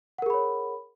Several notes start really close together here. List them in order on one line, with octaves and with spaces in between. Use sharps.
F#5 A#4 G#4 B5 C#5